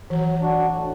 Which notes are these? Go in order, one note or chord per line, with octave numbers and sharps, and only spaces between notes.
E3 F#3
D4 F#4
A2